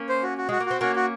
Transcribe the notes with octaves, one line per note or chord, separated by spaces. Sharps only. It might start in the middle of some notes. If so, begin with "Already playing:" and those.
Already playing: A#3 C#4
C5
F#4
F#4
G#3 F#4
A#3
C4 F#4
A#3 C#4 F#4
F#4